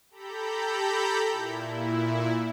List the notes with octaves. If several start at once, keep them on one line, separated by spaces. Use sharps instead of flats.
G4 A4 A#5 B5 G6
A#2 E4